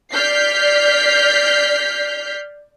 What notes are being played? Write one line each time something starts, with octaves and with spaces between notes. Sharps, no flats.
D5 F6 G6 B6 C7